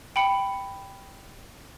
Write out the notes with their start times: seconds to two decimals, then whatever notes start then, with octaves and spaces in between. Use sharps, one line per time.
0.16 G5 B5 C#7